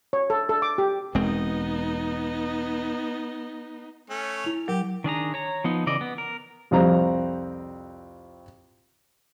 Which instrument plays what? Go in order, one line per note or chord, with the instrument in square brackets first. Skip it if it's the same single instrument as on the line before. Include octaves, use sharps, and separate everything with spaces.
[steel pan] C#5
A4
A4
D6
G4
[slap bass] E1 G#3 C4 [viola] B3 D#4
[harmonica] A3 C#4
[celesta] E4 F7
[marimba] F#3 [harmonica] G4 [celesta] A#4 G5
[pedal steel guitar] D#3 D4 G#4 A#5
C#5 A#5
F3 B3 D#4
C#3 E3 D5 D#5
B3
A#4
[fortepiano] C2 F2 C4 A#5